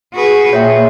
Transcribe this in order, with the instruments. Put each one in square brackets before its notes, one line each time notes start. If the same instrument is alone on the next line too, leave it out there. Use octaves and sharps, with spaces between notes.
[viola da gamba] F#4 G#4 B4
[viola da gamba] A#2 G#4 [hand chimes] C#5 E5 G5